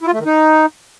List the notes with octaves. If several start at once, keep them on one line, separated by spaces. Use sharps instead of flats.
E4
F4
A3
D#3
D#4